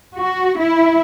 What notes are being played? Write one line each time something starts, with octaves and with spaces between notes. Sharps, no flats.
F#4
E4